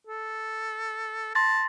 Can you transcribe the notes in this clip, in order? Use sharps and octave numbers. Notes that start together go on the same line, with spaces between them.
A4
A5 C6 A6 A#6